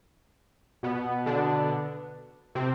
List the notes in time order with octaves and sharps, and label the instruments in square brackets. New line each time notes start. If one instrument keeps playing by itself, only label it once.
[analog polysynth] B2 B3
D3 D4
C3 C4